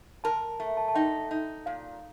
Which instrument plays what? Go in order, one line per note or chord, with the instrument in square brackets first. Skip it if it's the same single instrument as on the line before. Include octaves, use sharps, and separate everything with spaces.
[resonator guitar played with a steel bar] A#4 [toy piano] A5
[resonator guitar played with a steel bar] A3
[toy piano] A5
A5
[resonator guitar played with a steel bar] D#4 [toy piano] G5
[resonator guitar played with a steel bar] D#4
[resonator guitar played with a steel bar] A#2 [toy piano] F5